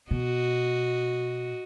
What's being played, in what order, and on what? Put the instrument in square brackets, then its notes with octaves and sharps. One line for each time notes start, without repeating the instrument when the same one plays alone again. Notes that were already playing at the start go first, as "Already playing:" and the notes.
[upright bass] B2 [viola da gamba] F#4 D#5